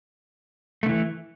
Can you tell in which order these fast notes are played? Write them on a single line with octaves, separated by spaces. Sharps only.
A3 D3 E3